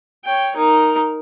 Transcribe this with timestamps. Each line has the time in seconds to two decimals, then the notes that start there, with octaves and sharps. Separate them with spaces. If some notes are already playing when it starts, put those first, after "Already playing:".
0.25 C#5 G5
0.56 D#4 A#4